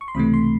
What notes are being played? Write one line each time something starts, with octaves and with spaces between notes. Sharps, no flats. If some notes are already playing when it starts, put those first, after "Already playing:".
C#6
C6
C#2 C3 E3 A3 B5
C6